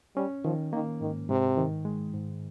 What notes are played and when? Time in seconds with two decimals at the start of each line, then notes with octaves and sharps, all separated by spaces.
0.16 G3 C#4
0.44 D#3 F3
0.72 D#3 A#3
1.01 G#2 D#3
1.29 G#2 C3
1.57 D#3
1.85 G#3
2.13 G#2